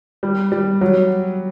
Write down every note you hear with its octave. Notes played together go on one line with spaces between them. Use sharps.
G3
G3
F#3